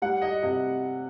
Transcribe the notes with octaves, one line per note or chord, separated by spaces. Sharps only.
G3 F#5
D#5
C3 D#5